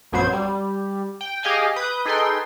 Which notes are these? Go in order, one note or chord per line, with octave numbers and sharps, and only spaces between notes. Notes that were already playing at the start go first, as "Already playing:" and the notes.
A#1 F#2 F#3 B3 C5 G#6
G3
G5
G4 G#4 D#5 F5 G5 G#5
B4 D#6 G6
D#4 G#4 A4 B4 G5 C6